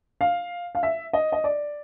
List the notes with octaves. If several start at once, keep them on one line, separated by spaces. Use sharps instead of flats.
F5
F5
E5
D#5
D#5
D5